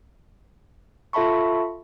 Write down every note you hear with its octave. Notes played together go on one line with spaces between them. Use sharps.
F4 A4 E5 A5 B5 C#6